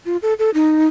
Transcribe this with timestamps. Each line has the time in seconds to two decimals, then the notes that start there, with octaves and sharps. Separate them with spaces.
0.06 F4
0.22 A4
0.39 A4
0.54 D#4